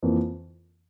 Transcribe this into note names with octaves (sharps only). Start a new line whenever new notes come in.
F2 E3 A#3 F4